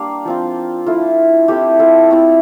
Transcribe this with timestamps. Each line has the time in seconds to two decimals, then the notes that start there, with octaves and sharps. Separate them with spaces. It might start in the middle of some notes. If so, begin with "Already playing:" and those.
Already playing: G3 A#3 D4 D5 F5
0.25 F3 C4 F4
0.86 A3 E4 F4
1.48 A3 C4 E4 G4
1.79 F4 A4
2.11 A3 C4 E4